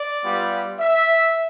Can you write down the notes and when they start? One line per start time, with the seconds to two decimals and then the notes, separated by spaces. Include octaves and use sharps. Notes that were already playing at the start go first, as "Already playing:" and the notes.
Already playing: D5
0.24 G3 B3 F4
0.80 E5